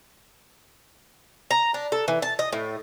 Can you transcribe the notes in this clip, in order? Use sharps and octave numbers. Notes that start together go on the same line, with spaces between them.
A#5
D4
A4
E3
A5
D#5
A2